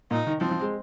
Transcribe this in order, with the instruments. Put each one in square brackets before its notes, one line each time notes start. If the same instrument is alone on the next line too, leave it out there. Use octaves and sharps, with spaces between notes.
[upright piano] A#2 [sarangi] D#4
[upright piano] D#3
[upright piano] F3 [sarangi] C4
[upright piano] F3
G#3